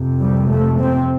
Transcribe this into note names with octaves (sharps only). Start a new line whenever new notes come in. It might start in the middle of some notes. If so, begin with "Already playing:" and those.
Already playing: F2 C3
G3
A3
C4